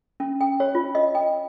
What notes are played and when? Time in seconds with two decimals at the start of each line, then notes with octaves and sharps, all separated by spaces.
0.20 C#4
0.41 G5
0.60 C#5
0.75 F4
0.95 D#5
1.15 G5